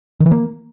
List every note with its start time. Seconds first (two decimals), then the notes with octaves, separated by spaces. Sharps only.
0.20 D#3
0.26 E3
0.31 A#3